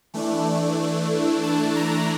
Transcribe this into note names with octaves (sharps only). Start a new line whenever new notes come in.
E3 A3 D4
A5
A#5